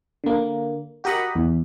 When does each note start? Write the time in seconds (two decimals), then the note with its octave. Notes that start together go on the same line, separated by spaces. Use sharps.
0.24 D3 A#3
1.04 F#4 G4 A#4 D#5 F#5 B5
1.35 E2